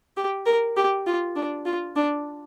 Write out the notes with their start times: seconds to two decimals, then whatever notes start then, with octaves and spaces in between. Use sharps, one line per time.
0.17 G4
0.46 A#4
0.77 G4
1.07 F4
1.36 D4
1.66 F4
1.96 D4